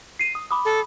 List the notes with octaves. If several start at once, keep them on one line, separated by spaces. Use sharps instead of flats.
C7 D#7
D#6
B5 D6 D#6
A4